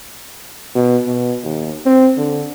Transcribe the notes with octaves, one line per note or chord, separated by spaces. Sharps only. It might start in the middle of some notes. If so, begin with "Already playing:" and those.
B2
B2
D#2
C4
D3